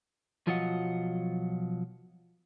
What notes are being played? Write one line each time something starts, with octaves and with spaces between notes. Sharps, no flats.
B1 F3 F#3 F4 D#5 F#5